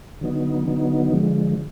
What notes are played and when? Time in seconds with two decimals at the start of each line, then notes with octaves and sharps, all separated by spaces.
0.21 D3 F#3 B3 D#4
0.67 D3 F#3 B3 D#4
1.13 D3 F3 G#3